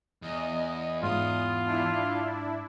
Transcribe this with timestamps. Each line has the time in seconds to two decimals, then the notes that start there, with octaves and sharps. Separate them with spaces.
0.22 E2 D#5
1.03 G#2 F4 D#6
1.66 D4 E4